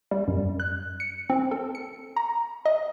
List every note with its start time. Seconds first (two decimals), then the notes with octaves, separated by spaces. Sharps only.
0.11 G3
0.28 F#2
0.60 F#6
1.00 C#7
1.30 C4
1.51 A4
1.75 C#7
2.16 A#5
2.66 D#5